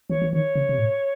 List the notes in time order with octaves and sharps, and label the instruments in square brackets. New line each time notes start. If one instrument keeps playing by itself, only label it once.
[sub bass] E3 [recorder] C#5
[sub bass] E3
[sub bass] D#3 [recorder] C#5
[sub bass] C#3
C3
A2